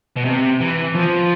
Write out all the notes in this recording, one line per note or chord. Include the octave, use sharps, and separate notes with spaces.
B2
C3
E3
F3